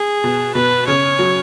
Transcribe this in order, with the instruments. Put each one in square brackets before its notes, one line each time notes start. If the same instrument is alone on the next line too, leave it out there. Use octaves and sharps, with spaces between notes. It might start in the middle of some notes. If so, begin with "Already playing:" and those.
Already playing: [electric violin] G#4
[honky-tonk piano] B2
[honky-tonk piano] B2 [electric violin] B4
[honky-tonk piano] C#3 [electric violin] C#5
[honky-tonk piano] F#3